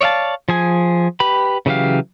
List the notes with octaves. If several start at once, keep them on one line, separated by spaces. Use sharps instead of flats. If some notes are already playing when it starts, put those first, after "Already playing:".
C#5 D5 E5 F5 A5
F3 G#4 G#5
G4 B4 B5
C#3 E3 F#3 G4 F5